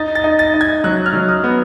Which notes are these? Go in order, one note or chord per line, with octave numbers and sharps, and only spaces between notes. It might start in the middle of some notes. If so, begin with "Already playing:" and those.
Already playing: D#4 A6
A6
D#4
A6
D#4
G#6
F#3 F#6
F6
F#3
D#6
B3